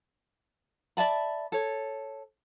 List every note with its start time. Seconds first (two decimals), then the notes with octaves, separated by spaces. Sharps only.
0.97 D5 E5 A5 B5
1.52 A4 C#5